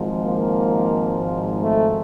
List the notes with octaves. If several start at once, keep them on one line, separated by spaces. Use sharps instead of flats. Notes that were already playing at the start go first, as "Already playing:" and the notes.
Already playing: G#1 G#2 F3
A#3
A3